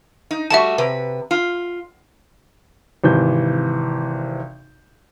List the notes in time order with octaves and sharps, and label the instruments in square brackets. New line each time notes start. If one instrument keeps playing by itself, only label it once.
[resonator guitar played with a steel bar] D#4
[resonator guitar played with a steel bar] G3 A3 F#4 [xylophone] E5 A5
[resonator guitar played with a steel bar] C3 B4
F4
[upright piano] G#1 C3 E3 G6